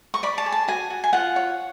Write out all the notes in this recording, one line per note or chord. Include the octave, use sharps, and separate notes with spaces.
C#6
D5 B5
A5
G#4
A5
F#4 G#5
F#4
G#5
F4 F#5
C#5